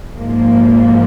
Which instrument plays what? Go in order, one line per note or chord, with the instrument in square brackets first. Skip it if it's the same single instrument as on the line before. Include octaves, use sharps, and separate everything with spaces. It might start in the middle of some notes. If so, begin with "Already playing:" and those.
[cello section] G#2 F3 A#3